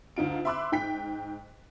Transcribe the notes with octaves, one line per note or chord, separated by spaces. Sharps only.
D2 D#4 F4 D7
E5 B5 C6 D6 E6 F#6
G#2 G5 B6